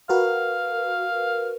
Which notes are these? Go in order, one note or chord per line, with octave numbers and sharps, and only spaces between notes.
F#4 A#4 B4 F5